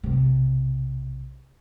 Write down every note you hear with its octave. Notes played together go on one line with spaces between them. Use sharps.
B1 C3